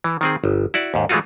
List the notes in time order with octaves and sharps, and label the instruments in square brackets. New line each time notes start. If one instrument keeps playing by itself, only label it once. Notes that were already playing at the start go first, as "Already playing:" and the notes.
[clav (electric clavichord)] E3
D#3 C4 G#4
G1
E4 F#4 D5
D#2 G#2
E3 G#3 A3 F4 F#4